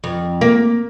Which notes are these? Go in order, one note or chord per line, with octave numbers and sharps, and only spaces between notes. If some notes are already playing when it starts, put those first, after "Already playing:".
F2
A#3